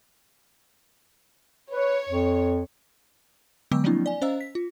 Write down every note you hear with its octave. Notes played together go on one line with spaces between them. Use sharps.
B4 C#5
F2
D3 F#3 G#3 B3 D6 E6
F3 F#3 A#3 C4 D4 E4
D5 G#5
C#4 C5 D#5 F5 A#5 E6
B6
F4